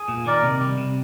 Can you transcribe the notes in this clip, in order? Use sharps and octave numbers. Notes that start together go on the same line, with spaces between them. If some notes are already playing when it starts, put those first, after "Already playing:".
Already playing: G#4
A#2
D#3 A#4 D5
C3
G3
C3